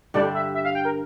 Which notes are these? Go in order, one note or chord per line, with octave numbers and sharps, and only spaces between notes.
G2 D3 G3 D4 D5
E5
E5
F5
G5
A#4